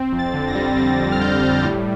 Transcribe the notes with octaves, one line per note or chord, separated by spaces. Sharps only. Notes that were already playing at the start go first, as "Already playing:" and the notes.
Already playing: C4
F2
A6
D3
A#6
G3
C4 A6
F2
F6
D3 G6
G3
A2